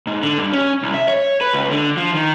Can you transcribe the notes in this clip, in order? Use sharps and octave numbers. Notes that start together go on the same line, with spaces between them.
G#2
D3
G2
C#4
C2
E5
C#5
B4
C#2
D3
F3
D#3